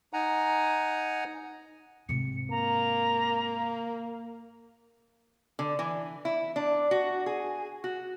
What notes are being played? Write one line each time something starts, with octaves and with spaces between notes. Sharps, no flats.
D#4 F#5 G#5 A#5
G#2 C3 C#7
A#3 A#5
D3
E3
E4
D4
F#4
G#4
F#4